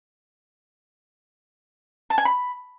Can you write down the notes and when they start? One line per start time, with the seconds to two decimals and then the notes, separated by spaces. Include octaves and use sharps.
2.10 A5
2.18 G#5
2.25 B5